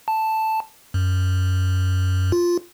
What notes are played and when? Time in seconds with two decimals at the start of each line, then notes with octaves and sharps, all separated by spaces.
0.08 A5
0.94 F#2
2.32 F4